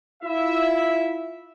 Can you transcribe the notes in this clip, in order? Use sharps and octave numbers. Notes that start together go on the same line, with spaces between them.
E4 F4 E5